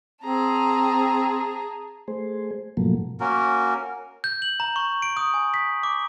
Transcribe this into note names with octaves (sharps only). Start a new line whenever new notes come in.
C4 G#4 A5 A#5
A3 G#4 C5
G#2 B2 F3 F#3 A3 A#3
A#3 C#4 F#4 A#4
G6
F#7
A#5
C#6
D7
D#6
G#5
B6
D6